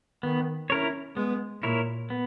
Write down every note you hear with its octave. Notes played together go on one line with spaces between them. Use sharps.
D#3 B3
C#4 E4 A#4 C#5
G#3 B3
A#2 E4 A#4 C#5
B3